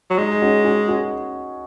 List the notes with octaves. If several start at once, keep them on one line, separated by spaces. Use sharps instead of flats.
F#3
G#3 D#4 G#4
C#4 F#4
C#4 F#4
C#4 F#4